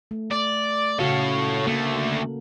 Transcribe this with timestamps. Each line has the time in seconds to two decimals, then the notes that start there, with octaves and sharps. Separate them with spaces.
0.11 A3
0.31 D5
0.99 C#3 F#4 A4 C#5 F5
1.67 D3 A3 A#3 A4